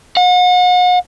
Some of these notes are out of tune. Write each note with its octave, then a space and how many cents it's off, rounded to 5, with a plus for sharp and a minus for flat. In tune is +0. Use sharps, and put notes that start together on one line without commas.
F#5 -40